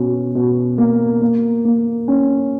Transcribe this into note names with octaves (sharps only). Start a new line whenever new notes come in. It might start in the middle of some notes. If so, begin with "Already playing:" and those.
Already playing: B2 C#4
B2
A#3
A#3
A#3
C#4